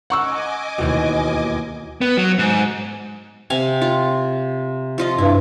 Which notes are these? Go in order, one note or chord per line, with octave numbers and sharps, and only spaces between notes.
D#5 F#5 G#5 C#6 D6 E6
D#2 B2 E3 G5
B3
F#3
G#2
C3 F5 G#5
F4
F3 F4 D#5
G2 E4